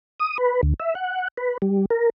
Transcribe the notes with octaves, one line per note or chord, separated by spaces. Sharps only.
D#6
B4
D2
E5
F#5
B4
G3
A#4